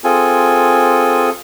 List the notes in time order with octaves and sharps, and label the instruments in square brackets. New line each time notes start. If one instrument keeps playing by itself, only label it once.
[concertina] C4 F4 G#4 A4 G#5